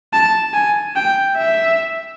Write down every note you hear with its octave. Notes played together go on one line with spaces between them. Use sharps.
A5
G#5
G5
E5